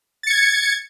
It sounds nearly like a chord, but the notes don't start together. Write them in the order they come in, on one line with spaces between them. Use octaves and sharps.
A6 C#7 G#6